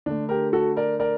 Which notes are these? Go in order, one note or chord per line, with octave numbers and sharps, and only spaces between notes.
D3 A3 D4
G4 A#4
F#4 A4
A#4 D5
A#4 D5